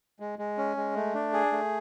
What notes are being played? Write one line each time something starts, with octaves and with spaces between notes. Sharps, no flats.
G#3
G#3
C#4
G#3
A3
D4
G#4
A3